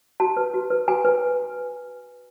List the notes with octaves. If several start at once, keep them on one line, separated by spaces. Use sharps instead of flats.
F#4 A5
B4
F#4
B4
F#4 G#5
B4